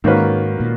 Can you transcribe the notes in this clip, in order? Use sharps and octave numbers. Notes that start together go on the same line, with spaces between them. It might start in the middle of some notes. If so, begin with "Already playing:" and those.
G#2 D#3 A#3 C#4 F#4 B4
A#2